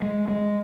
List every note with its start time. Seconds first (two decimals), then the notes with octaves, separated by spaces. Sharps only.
0.02 G#3
0.28 G#3